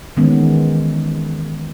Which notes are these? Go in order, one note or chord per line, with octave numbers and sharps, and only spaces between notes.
D#3 E3 G#3 B3 C#4